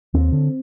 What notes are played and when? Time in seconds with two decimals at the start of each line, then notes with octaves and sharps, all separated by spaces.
0.14 D#2 C4
0.32 D3